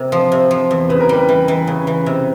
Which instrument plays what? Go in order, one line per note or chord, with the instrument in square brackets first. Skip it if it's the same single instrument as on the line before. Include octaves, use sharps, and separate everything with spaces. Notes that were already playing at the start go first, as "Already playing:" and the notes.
Already playing: [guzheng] C3 [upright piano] A#4
[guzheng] F3
C3
F3
E2
[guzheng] C#3 [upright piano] B4
[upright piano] A#4
[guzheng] G3 [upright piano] B4
[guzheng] E3
E3
C#3
E3
C3